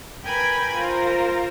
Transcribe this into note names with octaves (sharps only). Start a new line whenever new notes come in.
A#4 B4 G5 G#5 B5 G#6
F4 A#4 C5